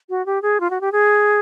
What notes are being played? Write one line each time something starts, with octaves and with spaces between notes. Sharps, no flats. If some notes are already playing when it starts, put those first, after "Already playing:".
F#4
G4
G#4
F4
F#4
G4
G#4